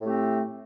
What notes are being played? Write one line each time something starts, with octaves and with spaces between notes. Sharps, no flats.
A2 A3 C4 G4